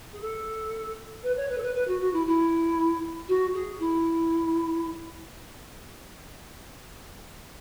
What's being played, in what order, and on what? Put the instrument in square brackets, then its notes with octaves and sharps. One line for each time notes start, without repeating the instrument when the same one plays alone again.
[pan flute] G#4
A4
B4
C#5
B4
A4
B4
B4
F#4
F#4
E4
E4
F#4
G#4
E4